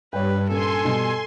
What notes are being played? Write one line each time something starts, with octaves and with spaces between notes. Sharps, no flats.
G2 B4 C#5 G5
A#2 A#3 C#4 A4 G#5 C6
B2 G3